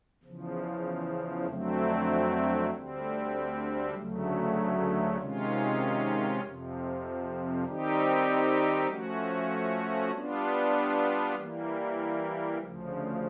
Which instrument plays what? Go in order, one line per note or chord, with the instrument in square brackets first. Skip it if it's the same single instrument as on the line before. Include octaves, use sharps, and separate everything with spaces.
[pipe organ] E2 C#3 F3
F2 D3 F#3 A3 C4
D2 D3 G3 C4
D2 C#3 F#3 A3
C3 D#3 G#3 C#4 F4
F2 C3 F3
D#3 G3 C4 D#4 G4
F3 A3 C#4 F#4
G3 B3 D4 F4
E3 G3 A#3
D2 C#3 F3